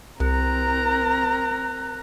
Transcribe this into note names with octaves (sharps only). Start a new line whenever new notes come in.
C2 C4 A#4 A#5 F#6